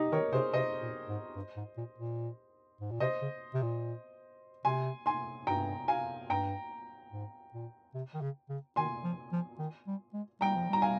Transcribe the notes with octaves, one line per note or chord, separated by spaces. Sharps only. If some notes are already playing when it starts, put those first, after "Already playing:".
Already playing: D#4 G4
D#3 A#4 C#5
C3 G#4 C5
C3 C5 D#5
A#2
G#2
G2
G#2
A#2
A#2
G#2
A#2
C3 C5 D#5
C#3
C3
A#2
C3 G#5 C6
G#5 C6
G2 G5 A#5
F5 G#5
G2 G5 A#5
G#2
A#2
C3
D#3
C#3
C#3
D#3 G#5 C6
F3
F3
D#3
G3
G#3
G3 G5 A#5
F3
G3 A#5
F5 G#5